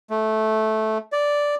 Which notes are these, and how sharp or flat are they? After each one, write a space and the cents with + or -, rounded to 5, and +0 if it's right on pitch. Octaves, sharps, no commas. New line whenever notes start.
A3 -10
D5 -5